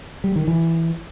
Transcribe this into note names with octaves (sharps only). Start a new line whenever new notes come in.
G3
D#3
E3